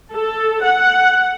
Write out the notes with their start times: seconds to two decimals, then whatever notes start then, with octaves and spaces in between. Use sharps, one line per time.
0.12 A4
0.64 F#5